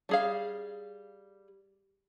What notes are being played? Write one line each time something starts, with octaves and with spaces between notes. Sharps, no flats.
G3 G#4 F5